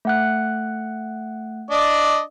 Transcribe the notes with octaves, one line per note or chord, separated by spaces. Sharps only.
A3 F#5 F#6
D4 D5 D#5